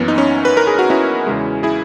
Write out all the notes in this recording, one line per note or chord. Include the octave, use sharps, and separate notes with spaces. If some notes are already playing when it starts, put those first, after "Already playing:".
Already playing: F#2 E3 A#3 B3
D#4
C#4
B4
A#4
G#4
F#4
C#4 E4
E2 C#3 G#3
E4 G#4